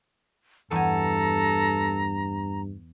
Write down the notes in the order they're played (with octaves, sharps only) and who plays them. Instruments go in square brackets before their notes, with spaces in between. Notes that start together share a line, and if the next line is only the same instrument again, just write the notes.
[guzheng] E2 G#5 [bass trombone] G2 [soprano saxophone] A4 [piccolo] A#5